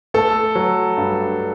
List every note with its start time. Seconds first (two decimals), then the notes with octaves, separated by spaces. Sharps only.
0.14 A3 A4
0.55 F#3
0.97 G2